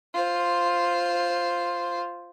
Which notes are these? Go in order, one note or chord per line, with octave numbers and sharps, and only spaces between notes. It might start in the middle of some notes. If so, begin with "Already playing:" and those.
F4 C5